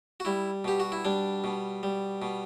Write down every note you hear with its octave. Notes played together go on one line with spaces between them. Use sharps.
F#4
G3 E4
B2 G4
F#4
E4
G3 D4
B2
G3
B2